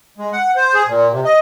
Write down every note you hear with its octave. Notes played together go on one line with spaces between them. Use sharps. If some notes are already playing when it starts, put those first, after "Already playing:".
G#3
F#5
C5
G#4
A#2
C3
D#5